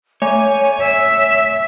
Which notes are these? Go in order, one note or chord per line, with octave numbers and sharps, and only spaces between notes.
A3 C#5 G#5
E5 E6